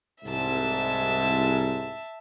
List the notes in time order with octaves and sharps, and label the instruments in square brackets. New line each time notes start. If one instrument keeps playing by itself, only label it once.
[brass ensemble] C2 G#2 [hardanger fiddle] E5 A5